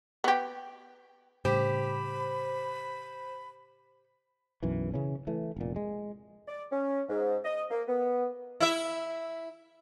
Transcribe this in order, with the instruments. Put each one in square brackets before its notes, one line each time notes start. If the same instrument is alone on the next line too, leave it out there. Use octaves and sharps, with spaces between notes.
[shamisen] B3 G4
[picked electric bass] A2 C#3 G3 [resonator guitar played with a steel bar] G4 [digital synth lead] C5 [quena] B5
[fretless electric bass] B1 F#2 E3
C#3 E3 C#4
E3 A3
F1 A#2
G#3
[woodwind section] D5
C#4
G#2
D#5
A#3
B3
[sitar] E4 E5